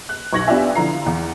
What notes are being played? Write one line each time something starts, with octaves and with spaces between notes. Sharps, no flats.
F#6
B1 C#6 G#6 A#6 F#7
B3 D4 F4 G4 E5 G#5
D3 F3 E4 F4 A#5 C7
E2